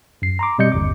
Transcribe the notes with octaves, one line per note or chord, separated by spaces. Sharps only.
F#2 C7
A#5 C6 D6
B2 G3 C4 D#5 G6 C#7
G1 D#2 D6